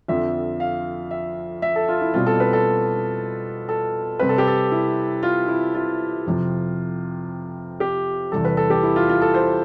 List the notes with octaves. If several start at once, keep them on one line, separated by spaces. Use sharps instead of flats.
F2 D3 F3 C4 E5
F5
E5
E5
A4
F4
E4
B2 G3 C4 F4
A4
B4
A4
A4
C3 G3 C4 B4
A4
G4
A4
E4
F4
E4
F4
F2 C3 F3
G4
E2 C3 E3 G3 A4
B4
A4
G4
E4
F4
F4
A4
C5